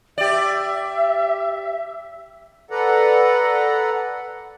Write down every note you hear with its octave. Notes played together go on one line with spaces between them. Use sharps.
G4 D5 E5
A4 B4 D5 F#5 A#5